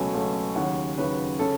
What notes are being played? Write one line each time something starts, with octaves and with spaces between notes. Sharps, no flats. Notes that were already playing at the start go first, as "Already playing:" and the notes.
Already playing: C#2 B2 F#3 A3 G#5
C#2 B2 F#3 A3
D#2 C#3 F#3 F#5
D#2 C#3 F#3 B4
C#3 A4